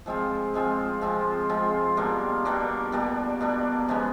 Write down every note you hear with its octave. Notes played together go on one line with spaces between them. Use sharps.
F3 G#3 C4 F4
F3 G#3 C4 F4
F3 G#3 C4 F4
F3 G#3 C4 F4
B2 G3 A#3 D4
B2 G3 A#3 D4
B2 G3 A#3 D4
B2 G3 A#3 D4
C#3 F3 G#3 B3